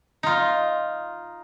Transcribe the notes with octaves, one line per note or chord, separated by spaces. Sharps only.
D#4 F4